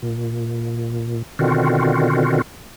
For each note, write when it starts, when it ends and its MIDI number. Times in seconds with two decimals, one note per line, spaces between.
0.02 1.23 46
1.39 2.42 47
1.39 2.42 50
1.39 2.42 51
1.39 2.42 60
1.39 2.42 65
1.39 2.42 66